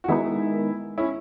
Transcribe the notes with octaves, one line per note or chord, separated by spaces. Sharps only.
F#4
D#3 G#3 B3 D#4 E4 G#4
C#4 E4